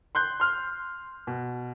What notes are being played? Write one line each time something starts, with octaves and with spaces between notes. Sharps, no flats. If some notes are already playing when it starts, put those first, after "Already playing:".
C6 F#6 G6
C6 F6
B2